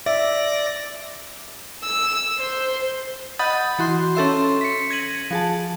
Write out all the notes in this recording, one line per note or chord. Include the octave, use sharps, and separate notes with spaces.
D5 E5 A#6
E6
C5
D#5 F#5 B5 D#6 G6 A6
E3 F#4 C6
C#4 A4 E5 C6
B6 C#7
G#6 A#6 D#7 F#7
F3 G#4 A5